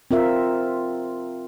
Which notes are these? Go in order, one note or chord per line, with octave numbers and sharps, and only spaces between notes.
C4 F4 A#4 E5